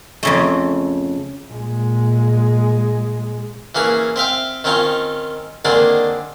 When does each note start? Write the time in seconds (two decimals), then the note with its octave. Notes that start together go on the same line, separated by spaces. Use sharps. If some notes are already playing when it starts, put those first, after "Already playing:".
0.23 F2 C#3 A3
1.48 A#2 G#3
3.75 E3 A#3 C#4 G#4
4.16 C4 E5 F5 G5
4.64 D#3 C4 C#4 D#4 F4
5.65 D3 D#3 A#3 C4 D4 G#4